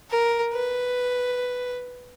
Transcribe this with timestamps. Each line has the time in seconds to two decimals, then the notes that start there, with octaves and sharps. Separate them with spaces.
0.11 A#4
0.53 B4